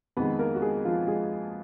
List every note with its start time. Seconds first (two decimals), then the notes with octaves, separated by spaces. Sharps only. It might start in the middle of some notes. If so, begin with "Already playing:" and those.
0.17 F2 D#3 G#3 B3 B4
0.39 A#3 A#4
0.55 F#4
0.62 G#3 G#4
0.85 F3 F4
1.07 G#3 G#4